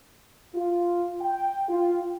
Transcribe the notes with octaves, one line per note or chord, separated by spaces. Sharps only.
F4
G5
F4